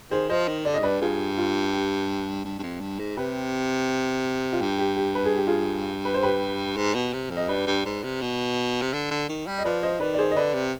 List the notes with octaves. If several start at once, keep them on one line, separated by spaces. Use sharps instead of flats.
D#3 G#4 C5
F3 C5 D#5
D#3
D3 D5
D#5
G#2
G2 B4 D5
G2 F4 G#4
F4
G4
G2
G2
F2
G2
G#2
C3 G4 B4
F4
G2 G4
G4
G4
B4
G#4
G4
F4 G#4
B4
C5
G4 B4
G#2
B2
C3
F2
D#5
G2 B4 D5
G2
G#2
C3
B2
C3
D3
D3
D#3
G3
D#5
F3 B4 D5
C5 D#5
D#3 B4 D5
D5
G#4 C5
D#5
D3 B4 D5
C3